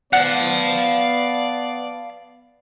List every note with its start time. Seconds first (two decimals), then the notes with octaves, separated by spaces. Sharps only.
0.13 B3 D5 F5 F#5 A5